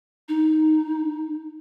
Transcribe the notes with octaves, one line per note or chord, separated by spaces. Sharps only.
D#4